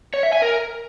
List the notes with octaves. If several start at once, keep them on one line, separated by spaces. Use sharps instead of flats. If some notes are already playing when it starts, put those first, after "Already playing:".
C#5
E5
G#5
A#4